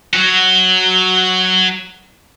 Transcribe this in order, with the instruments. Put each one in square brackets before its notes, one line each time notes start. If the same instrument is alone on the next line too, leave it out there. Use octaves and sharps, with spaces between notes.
[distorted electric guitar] F#3 F#4